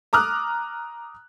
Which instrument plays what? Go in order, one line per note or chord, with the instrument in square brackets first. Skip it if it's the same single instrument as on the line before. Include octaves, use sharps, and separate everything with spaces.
[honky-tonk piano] A#5 D6 D#6 F6 F#6